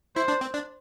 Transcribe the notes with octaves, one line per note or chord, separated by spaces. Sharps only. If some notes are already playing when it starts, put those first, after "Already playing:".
E4 C5
D4
C4
D4